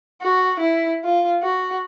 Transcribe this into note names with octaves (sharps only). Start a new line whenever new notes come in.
F#4
E4
F4
F#4